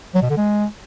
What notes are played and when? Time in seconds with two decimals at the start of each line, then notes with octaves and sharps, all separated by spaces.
0.15 F#3
0.22 B2
0.30 D3
0.37 G#3